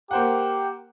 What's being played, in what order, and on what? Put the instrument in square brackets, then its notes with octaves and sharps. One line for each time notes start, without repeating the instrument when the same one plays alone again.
[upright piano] A#3 C5 F#5 [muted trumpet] G4